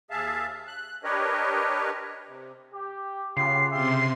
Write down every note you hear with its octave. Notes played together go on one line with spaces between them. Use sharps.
D#2 G#4 E5 F5 A5
F#6
D4 G4 A#4 B4 C#5 D#5
C3
G4
C#3 B3 F4 G4 C7
C3 F4 G4 E5 C6 C7